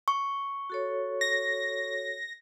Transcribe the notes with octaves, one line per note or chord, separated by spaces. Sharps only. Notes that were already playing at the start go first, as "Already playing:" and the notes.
C#6
F#4 A4 C#5
A#6